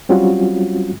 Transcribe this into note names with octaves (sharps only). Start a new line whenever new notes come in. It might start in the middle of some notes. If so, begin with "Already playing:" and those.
F#3 G3 C4 C#4 F4 F#4